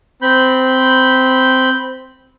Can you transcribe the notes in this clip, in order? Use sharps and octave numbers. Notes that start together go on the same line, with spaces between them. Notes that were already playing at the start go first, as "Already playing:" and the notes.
C4 B5 G6